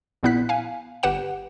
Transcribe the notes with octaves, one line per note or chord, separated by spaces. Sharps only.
A#1 A#2 B3 E4 F#6 B6
F5 G#5
G1 G4 B4 F#5 E7